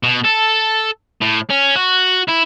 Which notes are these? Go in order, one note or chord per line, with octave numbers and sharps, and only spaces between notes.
B2
A4
A2
C#4
F#4
E4